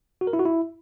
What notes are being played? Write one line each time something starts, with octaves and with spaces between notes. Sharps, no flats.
F#4
A#4
E4
F#4
E4